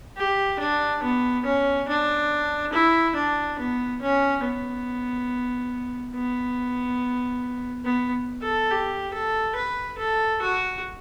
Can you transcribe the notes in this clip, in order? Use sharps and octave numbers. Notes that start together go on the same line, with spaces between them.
G4
D4
B3
C#4
D4
E4
D4
B3
C#4
B3
B3
B3
A4
G4
A4
B4
A4
F#4